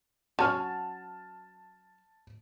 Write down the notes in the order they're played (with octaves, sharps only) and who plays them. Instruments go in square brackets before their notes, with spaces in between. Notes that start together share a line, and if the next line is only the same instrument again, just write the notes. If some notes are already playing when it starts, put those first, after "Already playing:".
[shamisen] F#3 C#4 F#4 [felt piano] A5 F6